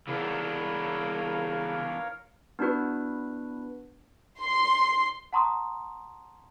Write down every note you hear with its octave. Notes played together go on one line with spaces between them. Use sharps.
C#3 E3 B3 D4 A#4 C#5 F5
B3 D4 E4 F#4 B4
C6
F#5 A5 A#5 C6 C#6 D#6